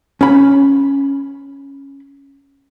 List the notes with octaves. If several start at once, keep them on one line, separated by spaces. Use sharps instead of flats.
C#4 B5